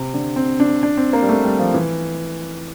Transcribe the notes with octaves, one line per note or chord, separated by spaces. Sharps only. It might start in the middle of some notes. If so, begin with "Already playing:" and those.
Already playing: C3
D3
C4
D4
D4
C4
A#3
G3
A3
G3
F3
E3